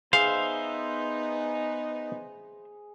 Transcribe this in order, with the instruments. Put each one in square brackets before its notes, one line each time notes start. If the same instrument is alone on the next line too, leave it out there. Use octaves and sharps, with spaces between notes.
[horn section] B3 D#4 [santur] G#4 [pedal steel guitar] C5 E5 [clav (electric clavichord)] F5